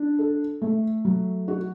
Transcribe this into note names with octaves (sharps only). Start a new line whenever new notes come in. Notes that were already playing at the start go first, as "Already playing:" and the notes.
Already playing: D4
A4
A3
F#3
F#4